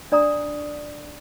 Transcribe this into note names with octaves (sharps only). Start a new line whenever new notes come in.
D4 D5 A#5 D#6